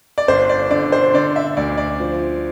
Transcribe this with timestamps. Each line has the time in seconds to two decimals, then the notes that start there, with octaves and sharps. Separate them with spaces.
0.18 D5
0.28 G1 C5
0.49 D5
0.71 D3 D5
0.92 C5
1.14 D3 D5
1.36 E5
1.57 D2 D5
1.78 D5
2.00 F3